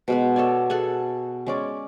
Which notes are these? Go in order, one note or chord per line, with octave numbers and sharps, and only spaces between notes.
B2 G#3 B3
A4 C#5 D5 G#5
G#4 A4 F#5 G#5
G#3 C#4 D5